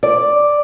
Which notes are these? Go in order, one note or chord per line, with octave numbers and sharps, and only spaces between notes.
D5